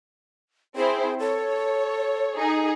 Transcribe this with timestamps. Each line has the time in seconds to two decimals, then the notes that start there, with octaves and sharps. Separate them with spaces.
0.76 C4 E4 G#4 C5
1.19 A4 C#5
2.37 D#4 G#4